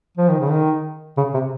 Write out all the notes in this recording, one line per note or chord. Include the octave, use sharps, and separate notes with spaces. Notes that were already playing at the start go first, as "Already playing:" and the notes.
F3
D#3
C#3
D#3
C#3
C3